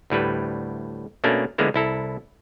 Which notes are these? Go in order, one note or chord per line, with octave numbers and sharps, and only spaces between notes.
D2 A2 G3 B4
B2 A3 A#3 C#4 D4
D3 F3 G#3 A#3 B3 E4
C2 E4 A4 A#5